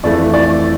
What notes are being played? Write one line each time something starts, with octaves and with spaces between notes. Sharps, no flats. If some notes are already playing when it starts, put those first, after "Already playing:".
F2 E3 A3 D5
D5